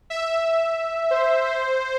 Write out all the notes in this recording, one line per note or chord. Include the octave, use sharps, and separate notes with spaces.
E5
C5
C5